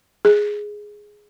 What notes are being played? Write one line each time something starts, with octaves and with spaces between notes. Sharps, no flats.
G#4